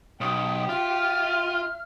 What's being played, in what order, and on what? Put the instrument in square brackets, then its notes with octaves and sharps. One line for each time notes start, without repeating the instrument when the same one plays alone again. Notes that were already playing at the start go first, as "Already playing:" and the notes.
[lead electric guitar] B1 [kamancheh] G4 [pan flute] D#6
[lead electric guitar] F4 [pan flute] E5 [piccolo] F6